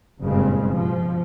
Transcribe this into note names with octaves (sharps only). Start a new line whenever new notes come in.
F#1 G2 A#2 C#3 G#3 C4
B2 F3